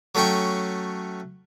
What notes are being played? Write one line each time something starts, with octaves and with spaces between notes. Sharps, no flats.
F#3 A3 C#4 G5 C#6